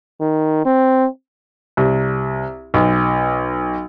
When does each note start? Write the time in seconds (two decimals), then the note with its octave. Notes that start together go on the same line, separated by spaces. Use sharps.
0.21 D#3
0.65 C4
1.77 C2
2.74 B1